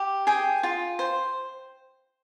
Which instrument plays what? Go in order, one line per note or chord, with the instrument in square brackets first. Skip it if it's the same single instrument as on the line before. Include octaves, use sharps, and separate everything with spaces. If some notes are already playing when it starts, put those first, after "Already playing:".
Already playing: [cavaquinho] G4
G#4 G5
F4
C5